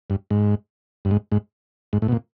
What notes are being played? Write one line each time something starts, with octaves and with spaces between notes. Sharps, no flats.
G2
G#2
G2
G#2
G#2
G#2
A2
B2
A#2